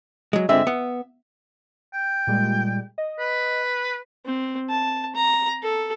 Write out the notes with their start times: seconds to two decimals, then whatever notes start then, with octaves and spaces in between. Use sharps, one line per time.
0.33 F#3 G#3
0.49 D3 G#3 C4 E5
0.67 B3
1.94 G5
2.27 A#2 G3 G#3
2.98 D#5
3.19 B4
4.26 C4
4.70 A5
5.15 A#5
5.63 A4